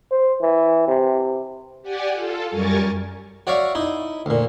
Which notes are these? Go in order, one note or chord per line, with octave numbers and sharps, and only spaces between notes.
C5
E3
C3
G4 D5 F#5 G#5
F4 A4
F#2 G3 A#4 G#5 C#6 A6
F#4 C#5 D5 E5 F5 C#6
D#4 E4
D2 A#2